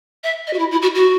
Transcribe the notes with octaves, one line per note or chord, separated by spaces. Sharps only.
E5
D#5
F#4
E4
E4
F#4
F#4